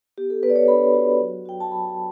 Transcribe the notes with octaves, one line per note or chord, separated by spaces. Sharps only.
B3 G4
A4
B3 B4
D5
C#5
D4 B5
F#4
F#3
F#4 G5
A5
F#3 B5